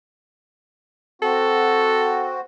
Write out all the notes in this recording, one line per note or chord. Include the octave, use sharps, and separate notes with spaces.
C4 F#4 A4